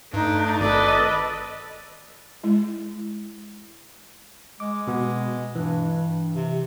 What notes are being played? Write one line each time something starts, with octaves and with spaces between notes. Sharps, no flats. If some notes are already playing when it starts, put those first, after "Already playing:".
G2 A3 D4 D#4
G#1 A4 B4 D5 D#5
G#3 E4
G#3 D6
B2 B3
G2 E3
C3